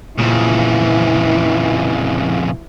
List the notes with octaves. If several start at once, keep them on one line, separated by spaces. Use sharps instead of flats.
F2 A#2 C#3 E3